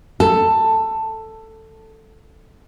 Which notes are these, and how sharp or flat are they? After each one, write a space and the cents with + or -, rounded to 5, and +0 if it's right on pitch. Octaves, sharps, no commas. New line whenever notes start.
A4 +10